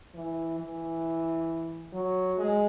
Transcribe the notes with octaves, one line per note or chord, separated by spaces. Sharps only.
E3
E3
F#3
G#3